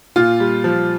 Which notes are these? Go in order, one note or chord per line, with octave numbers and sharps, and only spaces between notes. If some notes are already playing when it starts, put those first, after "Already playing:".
A#2 F4
G3
F3